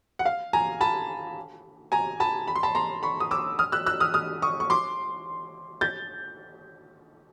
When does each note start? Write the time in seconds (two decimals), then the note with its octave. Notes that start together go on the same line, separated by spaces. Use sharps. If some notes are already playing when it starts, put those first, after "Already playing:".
0.19 F#5
0.26 F5
0.53 G#5 A#5
0.81 A5 B5
1.92 G#5 A#5
2.20 A5 B5
2.48 B5
2.56 C6
2.63 A5 B5
2.75 A#5 C6
3.03 B5 C#6
3.20 D#6
3.31 D6 E6
3.59 D#6 F6
3.72 E6 F#6
3.86 E6 F#6
4.00 D#6 F6
4.14 D#6 F6
4.42 C#6 D#6
4.60 C#6
4.70 C6 D6
5.81 G6 A6